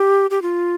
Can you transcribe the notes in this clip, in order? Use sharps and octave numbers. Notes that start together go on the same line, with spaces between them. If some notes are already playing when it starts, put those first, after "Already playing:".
Already playing: G4
G4
F4